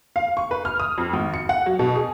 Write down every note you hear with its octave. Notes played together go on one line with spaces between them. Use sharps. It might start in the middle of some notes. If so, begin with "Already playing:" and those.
F5
C#6
B4
F6
D#6
F2
G#1
C#7
F#5
F#3
B2
G#4